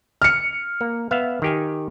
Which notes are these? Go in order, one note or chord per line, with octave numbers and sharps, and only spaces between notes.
F6 C#7
A#3
B3 E5 F5
D#3 G4 G#5